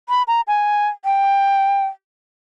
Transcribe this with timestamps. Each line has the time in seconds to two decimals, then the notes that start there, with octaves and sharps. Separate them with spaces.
0.09 B5
0.28 A#5
0.48 G#5
1.05 G5